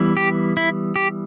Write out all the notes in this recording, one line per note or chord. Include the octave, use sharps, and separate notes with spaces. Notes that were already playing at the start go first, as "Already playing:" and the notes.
Already playing: E3 G3 B3 E4
G4
E4
G4